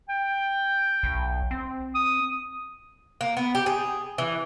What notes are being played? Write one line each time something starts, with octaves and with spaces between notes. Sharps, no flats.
G5
B1
C4
D#6
A#3
B3
G4
G#4
E3